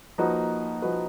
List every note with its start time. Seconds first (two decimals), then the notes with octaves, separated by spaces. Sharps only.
0.18 F3 A#3 D#4 F#4 B4
0.82 F3 A#3 D#4 F#4 B4